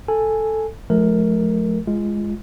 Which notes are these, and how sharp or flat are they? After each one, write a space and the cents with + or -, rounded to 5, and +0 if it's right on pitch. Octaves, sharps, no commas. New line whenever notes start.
A4 +0 G#5 +0
F3 +20 A3 -30 A#4 +0
G#3 +0 F4 -25